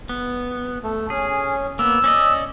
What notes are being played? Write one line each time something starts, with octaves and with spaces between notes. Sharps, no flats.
B3
A3
C#4 G#4
A#3 B3 E6
C#4 D5 D#5